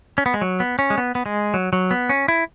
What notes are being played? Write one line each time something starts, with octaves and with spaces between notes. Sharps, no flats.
C#4
B3
G#3
F#3
B3
C#4
G#3
B3
B3
G#3
F#3
F#3
B3
C#4
E4